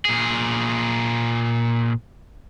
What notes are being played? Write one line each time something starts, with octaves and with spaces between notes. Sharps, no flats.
A#2 G#4